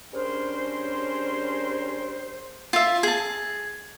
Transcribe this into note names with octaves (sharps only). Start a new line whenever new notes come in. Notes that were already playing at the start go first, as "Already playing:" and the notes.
G3 C#4 D4 G#4 A#4 C5
F4 E5
G#4 A5